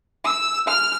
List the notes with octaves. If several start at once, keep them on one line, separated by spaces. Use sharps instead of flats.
E6
F6